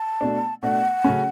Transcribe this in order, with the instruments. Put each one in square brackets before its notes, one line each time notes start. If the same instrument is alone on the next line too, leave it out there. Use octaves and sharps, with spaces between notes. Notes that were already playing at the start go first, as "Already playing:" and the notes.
Already playing: [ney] A5
[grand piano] B2 A3 D4
[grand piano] B2 A3 D4 [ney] F#5
[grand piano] C#3 F#3 A3 C#4